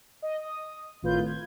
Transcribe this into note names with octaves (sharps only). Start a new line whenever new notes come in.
D#5
D#6
G#1 A2 F4 B4 G6
G#6